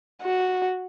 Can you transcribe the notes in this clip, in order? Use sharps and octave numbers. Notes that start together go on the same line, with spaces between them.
F#4